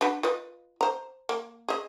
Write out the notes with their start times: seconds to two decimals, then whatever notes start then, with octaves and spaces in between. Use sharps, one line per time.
0.01 D4 F#4 B4
0.23 F4 B4 D#5
0.81 C5 A#5
1.29 A#3
1.68 G#4 D#5